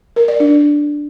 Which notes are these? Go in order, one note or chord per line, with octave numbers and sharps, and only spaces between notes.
A#4
D5
D4